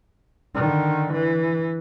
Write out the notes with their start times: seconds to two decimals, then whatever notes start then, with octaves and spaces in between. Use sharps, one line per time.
0.55 D3 D#3
1.13 E3